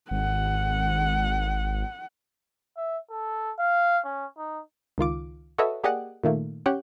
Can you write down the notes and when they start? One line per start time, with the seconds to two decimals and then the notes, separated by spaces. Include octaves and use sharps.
0.11 G#1 F#5
2.77 E5
3.11 A4
3.59 F5
4.04 C#4
4.38 D#4
4.98 C#2 D#3 F4 D6
5.58 F#4 A4 B4 C#5 D#5 E5
5.84 A#3 G4 G#4 D5 D#5 F#5
6.24 A#2 D#3 A3 A#3
6.66 C#4 G4 C#5 F#5 G5